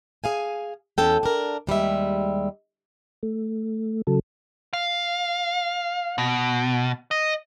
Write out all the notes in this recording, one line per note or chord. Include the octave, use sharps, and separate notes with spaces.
G#4 F5 G#5
E2 C#4 A4 G5
D4 A#4
D#2 G3 G#3 E5
A3
C#3 F#3 A4
F5
B2
D#5